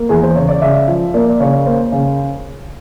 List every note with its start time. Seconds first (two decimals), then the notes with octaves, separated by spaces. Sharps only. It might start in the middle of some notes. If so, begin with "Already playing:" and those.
Already playing: A#3
0.09 E2 G#4
0.23 C5
0.36 C#3 C#5
0.49 D5
0.62 C#3 E5
0.88 F3
1.14 A#3 D5
1.40 C#3 C#5
1.66 A#3 C5
1.92 C#3